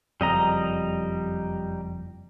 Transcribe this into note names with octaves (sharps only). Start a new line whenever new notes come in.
F#1 F2 G3 D#5 A#5